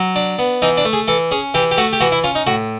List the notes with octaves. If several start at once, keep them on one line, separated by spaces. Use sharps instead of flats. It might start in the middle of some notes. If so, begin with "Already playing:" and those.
Already playing: F#3
D4
B3
E3 D#4
D4
A3
G#4
E3 A4
C#4 G#4
E3 G4
G4
A3 F#4
G4
E3 F#4
E4
C#4 F4
D#4
A2 F#4